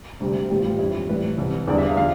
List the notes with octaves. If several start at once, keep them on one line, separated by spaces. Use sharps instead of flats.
D2 C3 G3
A2 E3 G3 G4
F4
G4
F2 D3 G3 E4
A2 E3 G3 B4
C2 C3 E3
E2 D3 G3 D5
E5
F5
D3 F3 F5